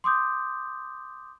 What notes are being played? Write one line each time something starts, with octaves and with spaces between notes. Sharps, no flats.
C6 D6 D#6 G6